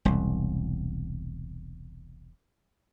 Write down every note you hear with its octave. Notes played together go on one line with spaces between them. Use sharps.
E1 C2